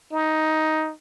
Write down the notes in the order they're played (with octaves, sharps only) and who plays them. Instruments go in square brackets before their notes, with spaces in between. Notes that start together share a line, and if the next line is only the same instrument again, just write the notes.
[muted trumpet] D#4